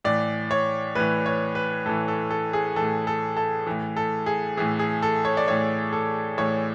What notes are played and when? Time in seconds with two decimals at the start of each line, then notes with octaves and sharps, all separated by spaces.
0.05 A2 E3 D5
0.51 C#5
0.95 A2 E3 B4
1.26 C#5
1.55 B4
1.86 A2 E3 A4
2.08 A4
2.31 A4
2.53 G#4
2.76 A2 E3 A4
3.07 A4
3.37 A4
3.67 A2 E3
3.96 A4
4.26 G#4
4.57 A2 E3 G#4
4.79 G#4
5.03 A4
5.25 C#5
5.37 D5
5.48 A2 E3 C#5
5.93 A4
6.38 A2 E3 C#5